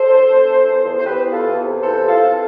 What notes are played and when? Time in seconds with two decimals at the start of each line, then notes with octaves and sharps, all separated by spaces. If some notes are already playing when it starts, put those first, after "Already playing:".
Already playing: A4 C5
0.08 D3
0.28 E2
0.46 E3
0.66 E2
0.85 E2
0.98 C5
1.05 E2 G4 B4
1.24 E3
1.30 F4 A4
1.44 E2
1.62 C3
1.81 E3 A4 C5
2.01 E3
2.07 F4 A4
2.20 C3